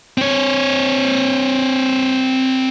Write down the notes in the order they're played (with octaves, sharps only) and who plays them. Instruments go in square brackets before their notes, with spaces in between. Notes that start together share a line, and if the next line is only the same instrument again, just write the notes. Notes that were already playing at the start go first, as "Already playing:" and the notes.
[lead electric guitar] C4 C#5